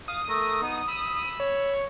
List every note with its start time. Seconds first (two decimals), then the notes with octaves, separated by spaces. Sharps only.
0.08 F5 D#6
0.29 A3 A#4
0.62 B3 D#4
0.87 B5 E6
1.40 C#5